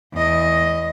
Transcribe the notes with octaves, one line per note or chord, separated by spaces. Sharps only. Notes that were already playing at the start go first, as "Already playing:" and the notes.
E2 D#5